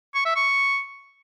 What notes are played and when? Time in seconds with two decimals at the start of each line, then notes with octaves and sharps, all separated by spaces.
0.15 C#6
0.25 E5
0.36 C#6